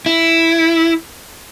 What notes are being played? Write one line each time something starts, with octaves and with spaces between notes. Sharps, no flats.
E4